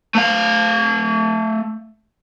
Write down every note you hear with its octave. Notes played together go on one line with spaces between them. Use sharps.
A3 F5